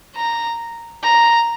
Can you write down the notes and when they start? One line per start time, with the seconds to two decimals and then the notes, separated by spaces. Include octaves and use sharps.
0.16 A#5
1.04 A#5